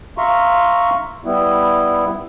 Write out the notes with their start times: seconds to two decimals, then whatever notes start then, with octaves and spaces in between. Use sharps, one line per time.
0.18 E5 F5 A#5 C6 C#6
1.25 G3 B3 E4